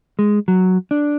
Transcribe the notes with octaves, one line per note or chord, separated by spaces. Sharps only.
G#3
F#3
D4